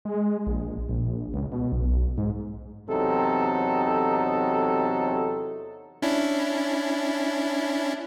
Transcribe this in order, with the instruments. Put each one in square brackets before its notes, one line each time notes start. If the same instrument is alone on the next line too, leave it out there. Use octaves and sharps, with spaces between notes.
[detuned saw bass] G#3
A#1
A#1
C#2
B2
B1
G#2
[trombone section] E2 C3 F#3 D#4 A4
[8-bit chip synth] C#4 D4 E4